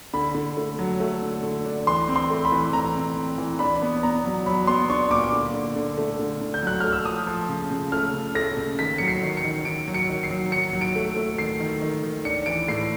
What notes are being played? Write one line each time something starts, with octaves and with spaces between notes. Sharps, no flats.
D3 B5
D3
A3
F#3
A3
D3
D3
D4
E3 C6
C4
C6
A3
B5
E3
C4 A#5
C4
C4
E3
D4 B5
B3
B3 A#5
F#3
F#3 B5
B3 C6
D4 C#6
A#2 D6
D3
D3
D3
A3
D3
D3
G6
F#3 F#6
A3 F6
E6
F3 D#6
F3
C#3
C#3
A3 F6
C#3
A3 A#6
C#3
D#3 B6
F#3 C#7
C7
D#3
C#7
D#3
D#3 D7
F#3
C#7
D#3
C7
F#3
D#3 C#7
F#3
D7
A3
A3
D#3 C7
D#3
D#3
D#3
D4 C#7
E3 D7
A2 C7